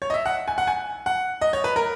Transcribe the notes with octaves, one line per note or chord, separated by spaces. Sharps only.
C#5
D#5
E5
F#5
G#5
F#5
G#5
F#5
D#5
C#5
B4
A#4